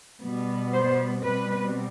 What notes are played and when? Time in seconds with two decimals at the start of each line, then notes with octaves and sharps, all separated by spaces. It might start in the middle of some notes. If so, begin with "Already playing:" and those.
0.21 B2 G3 B3
0.72 C5
1.23 B2 G3 C4 B4